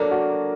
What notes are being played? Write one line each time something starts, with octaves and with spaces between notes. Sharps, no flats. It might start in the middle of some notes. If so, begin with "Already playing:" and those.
Already playing: F#3 A#3 D4 A4 A#4
F#4